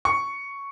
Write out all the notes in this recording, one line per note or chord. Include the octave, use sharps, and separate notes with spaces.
C#6